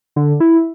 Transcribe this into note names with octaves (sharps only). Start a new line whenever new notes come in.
D3
E4